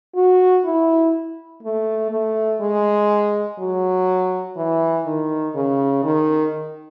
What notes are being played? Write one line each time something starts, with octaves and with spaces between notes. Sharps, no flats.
F#4
E4
A3
A3
G#3
F#3
E3
D#3
C#3
D#3